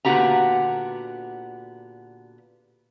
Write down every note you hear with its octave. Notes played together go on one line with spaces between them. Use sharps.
A#2 D3 B3 F#4 G4 A#5